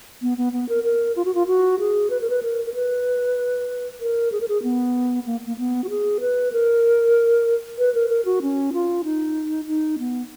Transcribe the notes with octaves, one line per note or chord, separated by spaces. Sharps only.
B3
B3
B3
A#4
A#4
F4
F#4
F4
F#4
G#4
B4
A#4
B4
A#4
A#4
B4
A#4
G#4
A#4
G#4
B3
A#3
A#3
B3
F#4
G#4
B4
A#4
B4
A#4
A#4
F#4
C#4
F4
D#4
D#4
B3